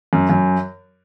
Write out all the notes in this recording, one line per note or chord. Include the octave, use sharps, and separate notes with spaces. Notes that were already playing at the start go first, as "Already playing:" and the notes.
F#2
F#2